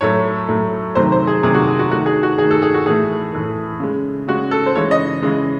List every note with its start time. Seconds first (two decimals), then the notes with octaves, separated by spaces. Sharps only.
0.01 A2 F#3 A3 C#5
0.48 A2 F#3 A3
0.95 C3 D#3 F#3 A3 C5
1.12 C5
1.27 G#4
1.43 C3 D#3 F#3 A3 G#4
1.55 F#4
1.67 G#4
1.79 F#4
1.91 A3 F#4
1.94 D#3
2.06 G#4
2.23 F#4
2.38 D#3 G#4
2.43 A3
2.51 A4
2.62 G#4
2.74 F#4
2.86 A2 E3 A3 G#4
3.33 A2 E3 A3
3.80 C#3 G#3
4.28 C#3 G#3 F#4
4.51 A4
4.66 C5
4.75 C#3 E3 G#3 C#5
4.91 D#5
5.22 C#3 E3 G#3